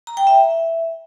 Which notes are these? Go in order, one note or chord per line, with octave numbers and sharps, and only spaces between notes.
A#5
G5
E5